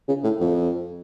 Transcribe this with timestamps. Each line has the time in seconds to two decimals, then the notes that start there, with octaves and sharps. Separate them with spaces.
0.08 C#3
0.23 A2
0.40 F2